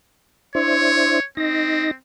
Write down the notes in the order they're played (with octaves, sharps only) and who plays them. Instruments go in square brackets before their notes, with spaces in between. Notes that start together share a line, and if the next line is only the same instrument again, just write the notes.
[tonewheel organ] D4 E4 C5 [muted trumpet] C#5
[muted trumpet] C4 [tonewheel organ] D#4 A#6